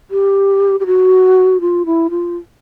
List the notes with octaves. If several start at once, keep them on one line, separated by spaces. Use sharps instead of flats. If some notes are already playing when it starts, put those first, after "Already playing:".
G4
G4
F#4
F4
E4
F4